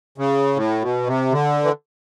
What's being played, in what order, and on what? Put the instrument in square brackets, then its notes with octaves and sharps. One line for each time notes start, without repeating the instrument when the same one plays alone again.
[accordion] C#3
A2
B2
C3
D3
E3